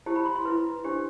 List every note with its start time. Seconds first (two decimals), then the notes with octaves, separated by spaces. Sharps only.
0.06 E4 G4 C5 A5
0.16 B5
0.26 C6
0.36 C6
0.45 E4 B4
0.84 D4 G4 C5